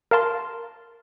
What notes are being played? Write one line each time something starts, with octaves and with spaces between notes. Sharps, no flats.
A#4 F5 A5 C6